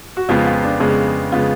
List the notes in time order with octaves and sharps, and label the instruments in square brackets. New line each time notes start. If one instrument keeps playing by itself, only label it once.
[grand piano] F#4
F2 C#3 G#3 B3 F4
F4
D4
F2 C#3 G#3 B3
C#3 G#3 B3 F4